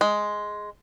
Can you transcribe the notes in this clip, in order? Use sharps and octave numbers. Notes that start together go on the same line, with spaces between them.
G#3